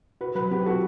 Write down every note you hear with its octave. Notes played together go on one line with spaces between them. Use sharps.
F#4 B4
F#3 B4
C4 G4
F#4 A4